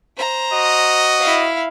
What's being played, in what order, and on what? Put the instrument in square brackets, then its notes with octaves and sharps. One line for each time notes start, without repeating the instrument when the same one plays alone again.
[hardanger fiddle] C5 A#5
[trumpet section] F#4 D#5
[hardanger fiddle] E4 F5